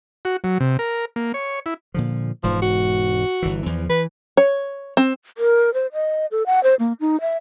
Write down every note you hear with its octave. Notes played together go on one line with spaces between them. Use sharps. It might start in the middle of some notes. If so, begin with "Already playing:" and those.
F#4
F#3
C3
A#4
A#3
C#5
E4
A#2 D3 F3
E1 G#2 F3
F#4
G1 E3
E2 E3 F3
E3 B4
C#5
C4
A#4
C5
D#5
A4
F#5
C5
A#3
D#4
E5